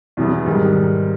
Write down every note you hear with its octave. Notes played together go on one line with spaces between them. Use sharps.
E2 B2 F#3 B3
G#2 D#3 G3